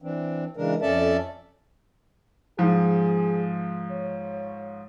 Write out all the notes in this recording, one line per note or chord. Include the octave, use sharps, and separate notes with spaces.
E3 C4 D4
C#3 E3 G#3 D4 A#4
F2 C#4 A4 D5 E5 A5
G#2 F3 G#4
C#5